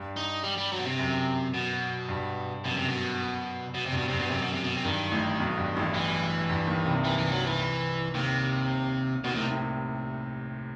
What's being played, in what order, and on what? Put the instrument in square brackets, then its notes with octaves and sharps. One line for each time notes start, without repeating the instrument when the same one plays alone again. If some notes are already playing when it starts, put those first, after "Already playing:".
Already playing: [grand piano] G2
[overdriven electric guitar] D#4
G3
G3
F#3
B2
C3
[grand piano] F#2
[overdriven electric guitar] B2
[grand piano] G2
[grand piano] F#2 [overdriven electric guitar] B2
[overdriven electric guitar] C3
B2
B2
C3
[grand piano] G2 [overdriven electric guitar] B2
[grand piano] G2 [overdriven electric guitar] C3
[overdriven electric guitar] B2
[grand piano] F#2 [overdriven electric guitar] C3
[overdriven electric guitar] B2
C3
B2
C3
[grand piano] G2 [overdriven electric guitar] D#3
[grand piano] A1 A2
B1 B2
G2
A1 A2
[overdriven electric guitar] E3
[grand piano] G2
D#2 D#3
C2 C3
[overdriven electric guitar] E3
E3
F#3
E3
[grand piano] D#2 D#3 [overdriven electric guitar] C3
[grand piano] D#2 D#3 [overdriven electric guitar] B2
[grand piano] C2 C3 [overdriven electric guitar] A2
[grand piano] A2